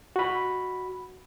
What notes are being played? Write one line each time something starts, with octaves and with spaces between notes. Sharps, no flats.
F#4 B5